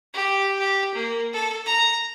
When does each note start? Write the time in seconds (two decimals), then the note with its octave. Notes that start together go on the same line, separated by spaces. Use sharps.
0.13 G4
0.59 G4
0.94 A#3
1.33 A4
1.66 A#5